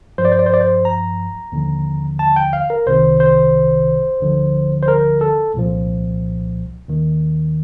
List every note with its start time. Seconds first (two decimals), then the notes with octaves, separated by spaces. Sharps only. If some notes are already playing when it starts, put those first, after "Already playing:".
0.18 G2 F3 C5
0.25 D5
0.32 C5
0.39 D5
0.46 C5
0.54 D5
0.61 C5
0.85 A#5
1.52 D#2 D3 F3
2.19 A5
2.36 G5
2.53 F5
2.70 A#4
2.86 C2 C3 D#3 C5
3.20 C5
4.21 D2 D3 F3
4.83 C5
4.88 A#4
5.21 A4
5.54 C2 A#2 F3
6.88 D#2 D#3